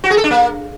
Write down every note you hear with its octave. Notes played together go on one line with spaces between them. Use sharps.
F#4
G#4
A4
D4
A#3